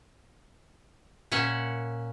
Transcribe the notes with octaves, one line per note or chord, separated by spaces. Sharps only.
A#2 C#4 E5 F#5